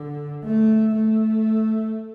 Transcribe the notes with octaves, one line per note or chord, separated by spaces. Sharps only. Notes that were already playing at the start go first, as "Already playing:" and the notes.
Already playing: D3
A3
A3